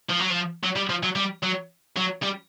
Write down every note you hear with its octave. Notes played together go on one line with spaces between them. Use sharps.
F3
F#3
F3
F#3
G3
F3
F#3
G3
F#3
F#3
G3